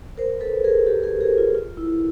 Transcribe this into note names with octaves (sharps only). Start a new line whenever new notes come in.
A#4 C5
A4 B4
G#4 A#4
G4 A4
G#4 A#4
G#4 A#4
F4
F4
E4